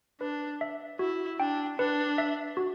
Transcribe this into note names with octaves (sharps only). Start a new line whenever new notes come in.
D4 B4
E5
E4 F#4
D4 G5
D4 B4
E5
F#4